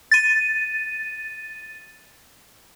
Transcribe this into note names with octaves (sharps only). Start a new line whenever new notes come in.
A6 D#7